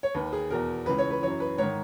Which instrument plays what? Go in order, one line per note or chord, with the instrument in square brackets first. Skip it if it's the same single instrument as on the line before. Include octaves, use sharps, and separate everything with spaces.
[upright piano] C#5
D#2 D#3 B4
G#4
E2 B2 A#4
C#2 C#3 E3 B4
C#5
B4
F#2 E3 C#5
B4
G#2 D#3 C#5